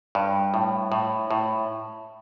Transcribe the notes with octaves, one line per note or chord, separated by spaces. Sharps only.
G2
A2
A2
A2